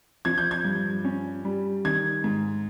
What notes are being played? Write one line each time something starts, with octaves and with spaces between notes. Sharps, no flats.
F3 G#6
G6
G#6
G2
C#4
G3
D#3 G#6
G#2